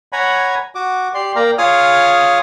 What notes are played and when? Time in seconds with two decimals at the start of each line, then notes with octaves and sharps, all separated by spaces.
0.13 C#5 F#5 G#5 A#5 B5
0.75 F#4 D6
1.14 G4 D5 C6
1.36 A#3 D5 F5 G5 A#5
1.58 F4 G#4 C#5 F5 D#6 F6